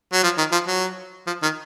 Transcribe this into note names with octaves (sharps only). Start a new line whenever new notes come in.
F#3
F3
D#3
F3
F#3
F3
D#3